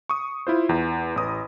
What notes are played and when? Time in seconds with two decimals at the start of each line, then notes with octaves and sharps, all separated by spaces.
0.09 C#6 D#6
0.47 E4 F4 C5
0.69 E2
1.16 A1 D#6